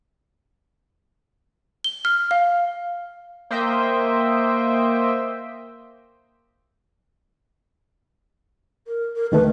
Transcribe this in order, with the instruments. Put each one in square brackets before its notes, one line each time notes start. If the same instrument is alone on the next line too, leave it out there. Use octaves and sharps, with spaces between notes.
[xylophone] G7
F6
F5
[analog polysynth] A#3 C5 D#5 E5 G5
[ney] A#4
A#4
[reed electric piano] D2 D#3 A3 [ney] B4